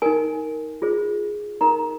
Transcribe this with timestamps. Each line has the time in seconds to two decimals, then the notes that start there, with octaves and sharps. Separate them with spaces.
0.02 D#4 A#4 G#5
0.82 F4 G#4 C5
1.61 D#4 A#4 A#5